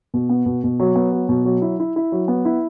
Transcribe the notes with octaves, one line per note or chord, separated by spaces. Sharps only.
B2
B3
B2
B2
F#3
B3
F#3
B2
F#3
E4
E4
E4
F#3
B3
E4